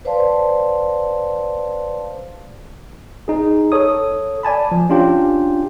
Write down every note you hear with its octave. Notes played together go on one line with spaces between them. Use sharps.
B4 C5 D5 F5 A5 C6
D#4 G#4
A4 C#5 D#6
D5 G#5 A5 B5
F3
C#4 D4 F4 G4 G5